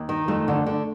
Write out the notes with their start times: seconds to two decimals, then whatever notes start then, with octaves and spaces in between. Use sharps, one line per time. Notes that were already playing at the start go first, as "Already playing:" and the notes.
Already playing: D#2
0.09 D#3
0.28 F2 A3
0.48 D3
0.66 D3